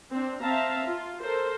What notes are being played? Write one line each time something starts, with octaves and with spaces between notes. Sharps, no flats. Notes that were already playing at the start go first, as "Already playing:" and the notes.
C4 D4
C4 E5 F5 A5 A#5
F4
A4 A#4 C5